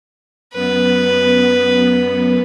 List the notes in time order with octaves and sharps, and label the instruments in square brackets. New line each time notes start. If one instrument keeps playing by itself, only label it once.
[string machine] F#2 B3 [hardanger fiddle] B4